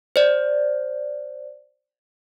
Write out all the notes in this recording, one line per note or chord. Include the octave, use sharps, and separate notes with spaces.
C5 D5